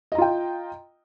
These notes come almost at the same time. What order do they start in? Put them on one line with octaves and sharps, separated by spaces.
D#5 A#5 F4 G5